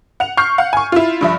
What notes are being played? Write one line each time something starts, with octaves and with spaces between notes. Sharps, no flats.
F#5 F7
C#6 F6 G6 C7
F5 F#5 F6
G#5 C#6
E4 F4
G2 F3 E5